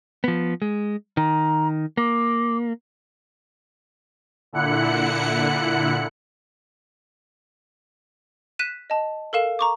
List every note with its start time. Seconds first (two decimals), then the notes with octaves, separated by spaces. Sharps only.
0.24 F3 B3
0.62 G#3
1.17 D#3 A#5
1.97 A#3 D6
4.53 A#2 D3 E4 F#5 F#6 C#7
8.59 F#6 B6 D#7 E7
8.90 D#5 A5
9.33 A4 A#4 F5 E7
9.59 A#5 C#6 D6